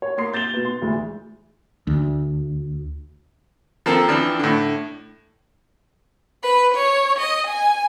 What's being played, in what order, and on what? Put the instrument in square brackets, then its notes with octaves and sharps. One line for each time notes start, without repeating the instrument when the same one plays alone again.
[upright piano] C#5
A#3 C6 C7
G6 A6 E7 F7 G7
B2 B4
C6
D2 A2 E3 G#3
[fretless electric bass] D2
[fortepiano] F3 A#3 C4 A4 A#4
E3 F3 C4 D4
A2 D3
[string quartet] B4
C#5
D#5
G#5